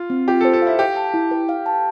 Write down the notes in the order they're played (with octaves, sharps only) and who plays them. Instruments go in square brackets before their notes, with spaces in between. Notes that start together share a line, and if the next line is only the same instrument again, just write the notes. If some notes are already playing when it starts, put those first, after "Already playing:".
Already playing: [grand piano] F4
[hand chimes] C4
[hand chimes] F4 [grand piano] G4
[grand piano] A4
[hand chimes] C5
[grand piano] A4
[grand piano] E4 [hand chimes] F5
[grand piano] G4 [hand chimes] F5
[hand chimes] A5
E4
B4
F5
A5